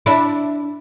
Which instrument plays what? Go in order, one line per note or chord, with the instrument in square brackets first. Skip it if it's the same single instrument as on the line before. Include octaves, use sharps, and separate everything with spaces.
[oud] D4 E4